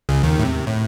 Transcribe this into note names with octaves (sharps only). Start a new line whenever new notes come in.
C#2 C#3
D#2 D#3
A2
C3
A2